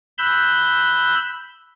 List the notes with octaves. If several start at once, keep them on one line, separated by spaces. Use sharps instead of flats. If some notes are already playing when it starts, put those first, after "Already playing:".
B5 E6 F#6 G6